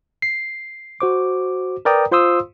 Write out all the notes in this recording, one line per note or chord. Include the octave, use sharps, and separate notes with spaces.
C7
F#4 C5 D6
A#4 B4 D5 G5 A#5 D#6
F4 C5 F5 C6 D#6 E6